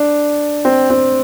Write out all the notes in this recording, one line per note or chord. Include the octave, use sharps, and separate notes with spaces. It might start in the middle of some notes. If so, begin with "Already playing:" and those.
Already playing: D4
C4
C4